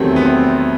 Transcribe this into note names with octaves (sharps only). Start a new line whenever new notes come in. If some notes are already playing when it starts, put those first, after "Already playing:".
Already playing: E2 C3 D#3 F#3 A3 C4
B3
C4